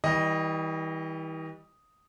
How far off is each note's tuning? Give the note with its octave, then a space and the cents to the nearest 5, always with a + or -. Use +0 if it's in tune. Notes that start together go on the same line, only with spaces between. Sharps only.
E3 -40 G3 +0 D#5 +0